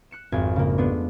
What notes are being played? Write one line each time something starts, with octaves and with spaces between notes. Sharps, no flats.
F#6 C#7 E7
G#1 F2 G#5
C#3 A#3
G#3 A3 B3 D4